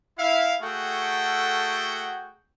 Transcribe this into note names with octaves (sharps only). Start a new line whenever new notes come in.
E4 E5 F5
A3 F#4 G#4 A4 F#5 G5